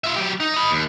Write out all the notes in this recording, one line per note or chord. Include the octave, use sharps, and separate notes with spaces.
F4 E5
F#3 G4
D#4
D#5 B5
D#2